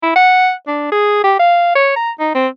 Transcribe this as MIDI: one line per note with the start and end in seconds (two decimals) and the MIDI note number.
0.03 0.14 64
0.16 0.53 78
0.67 0.91 62
0.92 1.19 68
1.24 1.35 67
1.39 1.73 77
1.75 1.91 73
1.96 2.11 82
2.20 2.34 63
2.35 2.47 60